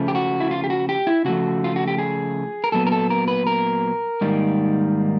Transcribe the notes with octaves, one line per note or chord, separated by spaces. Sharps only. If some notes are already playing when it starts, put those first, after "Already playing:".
Already playing: C#3 F3 A3
G4
F#4
E4
F4
G4
F#4
G4
E4
C#3 F3 A3 F#4
F4
F#4
G4
G#4
A#4
A#2 F#3 B3 A4
A#4
A4
A#4
B4
A#4
G#2 D#3 G3 A#3